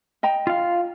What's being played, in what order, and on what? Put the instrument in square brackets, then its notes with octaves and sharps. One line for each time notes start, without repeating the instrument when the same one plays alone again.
[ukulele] D#5 G5 A#5
[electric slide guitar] F4 F5